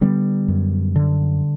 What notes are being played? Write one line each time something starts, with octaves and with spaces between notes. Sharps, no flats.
D3 G3 B3
F#2
D3